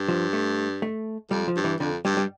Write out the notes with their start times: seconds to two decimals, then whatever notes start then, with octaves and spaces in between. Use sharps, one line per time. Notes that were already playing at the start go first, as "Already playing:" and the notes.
Already playing: G2
0.08 F3
0.33 A3
0.82 A3
1.30 F2 G3
1.48 F3
1.56 G2
1.64 E3
1.80 F2 D3
2.05 G2 G3
2.17 G3